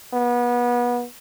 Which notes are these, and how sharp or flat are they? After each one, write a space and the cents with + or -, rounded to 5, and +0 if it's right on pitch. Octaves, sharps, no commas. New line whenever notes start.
B3 -30